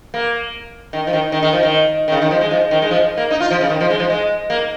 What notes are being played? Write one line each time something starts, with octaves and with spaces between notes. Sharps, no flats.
A#3
D#3
F3
D#3
D#3
D#3
F3
D#3
D#3
C#3
D#3
F3
G#3
F3
D#3
G#3
F3
A#3
D#4
F4
F3
C#3
D#3
F3
G#3
F3
G#3
A#3